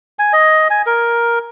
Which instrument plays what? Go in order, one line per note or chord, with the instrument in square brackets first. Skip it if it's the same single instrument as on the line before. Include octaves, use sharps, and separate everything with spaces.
[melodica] G#5
D#5
G#5
A#4